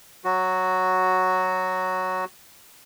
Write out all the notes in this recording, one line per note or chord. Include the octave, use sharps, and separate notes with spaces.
F#3 F#4